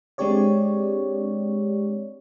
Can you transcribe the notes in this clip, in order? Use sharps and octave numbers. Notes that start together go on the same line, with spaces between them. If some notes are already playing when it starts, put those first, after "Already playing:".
G#3 C4 D4 G4 C#5 D5